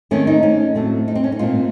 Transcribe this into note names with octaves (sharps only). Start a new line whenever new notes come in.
D#3 A3 C4 C#4
D#4
C#4
A2 F#3 A3 C4
D#4
C4
C#4
D#4
A#2 A3 C4 F4